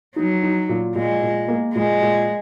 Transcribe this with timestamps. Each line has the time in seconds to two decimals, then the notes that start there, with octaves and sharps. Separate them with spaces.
0.16 F#3 D#4
0.43 D#4
0.69 A#2
0.96 A#2 G#3
1.22 A#2
1.48 A#3
1.75 A#2 G#3
2.02 A#2